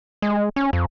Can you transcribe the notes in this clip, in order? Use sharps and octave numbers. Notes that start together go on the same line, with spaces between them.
G#3
C#4
F2